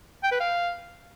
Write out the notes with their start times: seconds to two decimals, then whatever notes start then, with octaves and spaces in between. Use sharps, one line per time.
0.23 G5
0.32 B4
0.40 F5